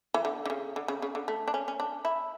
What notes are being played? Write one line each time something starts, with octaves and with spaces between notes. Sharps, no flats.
E3
D3
D3
C#3
D3
C#3
C#3
D3
A3
D4
C#4
C#4
D4
E4